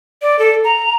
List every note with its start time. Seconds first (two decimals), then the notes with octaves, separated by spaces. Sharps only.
0.22 D5
0.39 A4
0.64 A#5